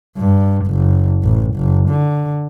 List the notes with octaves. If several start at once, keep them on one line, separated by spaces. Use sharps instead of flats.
G2
F#1
A1
F#1
D3